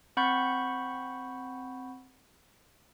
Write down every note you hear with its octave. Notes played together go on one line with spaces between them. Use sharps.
C4 F#5 B5 C#6 G6